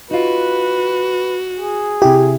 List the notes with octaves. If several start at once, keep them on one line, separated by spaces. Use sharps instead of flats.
D#4 F4 F#4 B4
G#4
C3 E4 G4